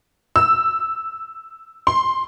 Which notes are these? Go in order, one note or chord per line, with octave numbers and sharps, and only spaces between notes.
E6
C6